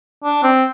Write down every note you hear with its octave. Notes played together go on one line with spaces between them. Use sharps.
D4
C4